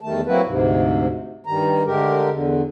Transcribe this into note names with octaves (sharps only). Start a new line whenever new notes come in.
E2 D#3 G3 A3 A5
F#3 A#3 C4 E4 F#4 B4
D2 G#2 C3
G2 D#3 G3 A#5
D3 G#3 A3 G4 A#4
E2 D3